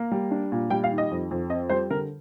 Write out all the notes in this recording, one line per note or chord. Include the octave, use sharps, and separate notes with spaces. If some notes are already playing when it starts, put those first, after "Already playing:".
Already playing: A#3
G3
D4
A#2
G3 G5
F5
D#3
D#5
F2
F2
C4 D#5
G3 C5
D3 A#4